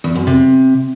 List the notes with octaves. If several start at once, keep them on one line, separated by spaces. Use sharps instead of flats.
E2
F#2
C3